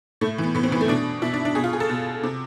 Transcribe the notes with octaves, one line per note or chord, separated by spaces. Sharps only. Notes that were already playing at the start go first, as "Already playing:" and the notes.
A2 A3
E3
B3
A2 B3
C4
E3 B3
A3
B2 D4
B2 E4
D4
D4
B2 G#4
F4
G#4
A4
B2
C3